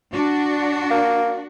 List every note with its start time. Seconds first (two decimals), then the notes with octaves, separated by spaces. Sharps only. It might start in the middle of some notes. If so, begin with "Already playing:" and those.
0.13 D4 F#4
0.91 A#3